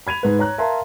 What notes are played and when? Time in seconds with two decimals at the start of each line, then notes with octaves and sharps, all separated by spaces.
0.07 B5 G#6 D#7 F7
0.23 G#2 B4
0.39 C#5 A#5 F#6
0.58 A#4 E5 F5 A5 A#5 C6